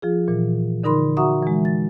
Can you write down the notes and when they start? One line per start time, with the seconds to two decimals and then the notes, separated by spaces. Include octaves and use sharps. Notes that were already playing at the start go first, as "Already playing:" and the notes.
0.02 F3 F4 G#4
0.28 A#2 E3
0.84 D3 D#4 A#4 B5 C6
1.17 F#4 E5 F#5 A#5 C#6 D#6
1.43 E3 G#3
1.65 A6